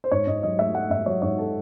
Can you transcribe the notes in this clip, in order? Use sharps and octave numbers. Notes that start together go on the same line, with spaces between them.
C5
G#2 C#5
G#2 D#5
F#3 D#5
A3 E5
A3 F#5
G#2 E5
F#3 C#5
G#2 C#5
A4